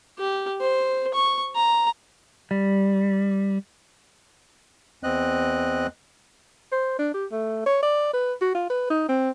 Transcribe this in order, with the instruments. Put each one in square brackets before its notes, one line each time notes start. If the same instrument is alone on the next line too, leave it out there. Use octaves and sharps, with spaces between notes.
[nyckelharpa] G4
C5
C#6
A#5
[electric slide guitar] G3
[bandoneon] E2 C4 D#5 F#6
[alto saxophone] C5
D4
G4
A3
C#5
D5
B4
F#4
F4
B4
D#4
C4